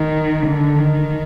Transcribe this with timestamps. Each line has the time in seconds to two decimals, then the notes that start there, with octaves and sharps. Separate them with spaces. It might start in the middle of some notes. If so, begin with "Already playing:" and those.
Already playing: D#3
0.47 D3
0.79 D#3